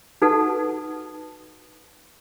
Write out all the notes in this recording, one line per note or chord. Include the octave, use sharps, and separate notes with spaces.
D#4 F#4 A4 B4 F#5 A5